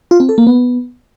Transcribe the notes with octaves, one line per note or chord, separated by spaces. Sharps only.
F4
C4
A4
A#3
B3